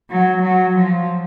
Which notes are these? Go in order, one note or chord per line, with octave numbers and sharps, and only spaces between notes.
F#3
F#3
F3